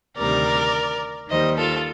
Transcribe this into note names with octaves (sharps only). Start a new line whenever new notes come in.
D2 C3 D#3 G3 A#4 D5
D#2 D#3 G3 C5 D#5
F4 A4